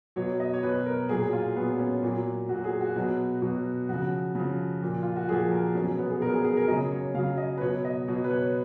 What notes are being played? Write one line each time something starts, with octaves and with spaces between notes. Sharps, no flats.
B2 F#3 C#5
D#5
C#5
B2 F#3 B4
A#4
A#2 F#3 G#4
F4
A#2 F#3 B3
C#4
A#2 F#3
A#2 F#3 F#4
G#4
F#4
B2 F#3
B2 F#3
C#3 F3 F#4
C#3 F3
A#2 F3
F4
F#4
A#2 F3 G#4
A#4
B2 F#3 C#4
C#4
B3
G#4
B2 F#3 A#4
G#4
G#4
A#4
C#3 F#3 D#5
C#5
C#3 F#3 F5
D#5
B4
B2 F#3 C#5
D#5
B2 F#3
B4
C#5